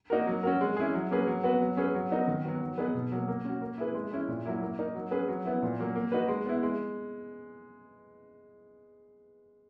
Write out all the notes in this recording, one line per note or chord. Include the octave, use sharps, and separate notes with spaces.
A#3 D#4 F#4 A#4
F#3
C#4 F#4 A#4
G#3
C#4 E4 G#4
F#3
A#3 C#4 G#4 B4
F#3
B3 F#4 B4
F#3
C#4 G#4 B4
F#3
B3 D#4 F#4 A#4
D#3
F#3 B3 F#4
F#3
B3 D#4 G#4 B4
B2
F#3 A#3
A#3
C#4 F#4
A#3
E4 G#4 B4
G#3
C#4 E4 G#4
A#2
F#3 A#3 E4
A#3
D#4 A#4
F#3
C#4 G#4 B4
F#3
B3 E4
A#2
F#3 A#3
A#3
D#4 F#4 B4
G#3
B3 E4
G#3